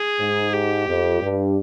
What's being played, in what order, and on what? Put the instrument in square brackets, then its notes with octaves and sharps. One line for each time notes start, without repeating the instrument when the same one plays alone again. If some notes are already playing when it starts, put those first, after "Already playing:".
Already playing: [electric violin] G#4
[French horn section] G#2
[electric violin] G4
[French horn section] F2
G2